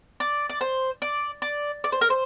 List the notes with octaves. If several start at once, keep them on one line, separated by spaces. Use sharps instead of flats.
D5
D5
C5
D5
D5
D5
C5
A#4
C5